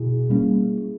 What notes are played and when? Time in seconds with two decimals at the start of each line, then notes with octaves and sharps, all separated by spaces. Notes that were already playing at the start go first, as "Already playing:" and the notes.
Already playing: B2 E4 G#4
0.30 G3 A#3 C#4